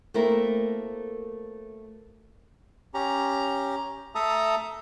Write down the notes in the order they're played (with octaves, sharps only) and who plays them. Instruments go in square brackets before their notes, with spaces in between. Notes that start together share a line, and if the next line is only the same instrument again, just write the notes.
[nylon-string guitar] A3 A#3 C4 E4 F#4 A#4
[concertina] C#4 G4 A#5
A3 A4 E5 A5 A#5 D#6